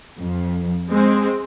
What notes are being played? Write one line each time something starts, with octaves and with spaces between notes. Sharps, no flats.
F2
G#3 C4